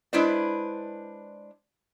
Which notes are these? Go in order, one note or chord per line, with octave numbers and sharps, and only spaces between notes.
G#3 D4 E4 B4 C5 D5